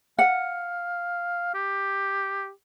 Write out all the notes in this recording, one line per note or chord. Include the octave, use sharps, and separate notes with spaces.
F5 F#5
G4